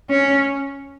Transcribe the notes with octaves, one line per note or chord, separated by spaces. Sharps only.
C#4